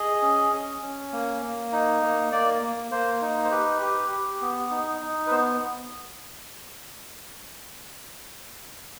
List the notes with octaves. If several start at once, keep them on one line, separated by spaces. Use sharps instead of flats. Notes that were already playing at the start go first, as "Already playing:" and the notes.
Already playing: G#4 D#5
C#4
C#4
C#4
A#3
A#3
D#4
A#3
A#3 D5
A#3
A#3 C5
D#4
C5
G4 B4
G4
G4
B3
D#4
D#4
B4
B3 C5